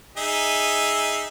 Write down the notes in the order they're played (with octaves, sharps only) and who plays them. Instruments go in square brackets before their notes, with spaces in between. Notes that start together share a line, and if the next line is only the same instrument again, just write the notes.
[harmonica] D#4 G#4 E5